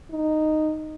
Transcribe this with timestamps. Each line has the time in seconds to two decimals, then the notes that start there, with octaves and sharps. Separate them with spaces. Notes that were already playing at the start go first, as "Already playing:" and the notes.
0.11 D#4